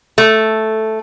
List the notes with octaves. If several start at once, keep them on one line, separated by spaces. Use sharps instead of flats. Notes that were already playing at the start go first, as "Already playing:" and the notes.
A3